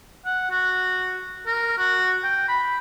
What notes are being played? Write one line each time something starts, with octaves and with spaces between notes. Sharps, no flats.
F#5
F#4
A#4
F#4
G5
B5